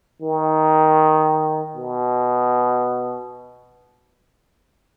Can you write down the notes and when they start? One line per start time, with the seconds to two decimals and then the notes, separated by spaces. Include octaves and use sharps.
0.22 D#3
1.76 B2